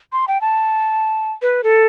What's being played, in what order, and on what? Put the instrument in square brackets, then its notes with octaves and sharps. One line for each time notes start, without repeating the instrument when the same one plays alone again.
[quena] C6
G5
A5
B4
A4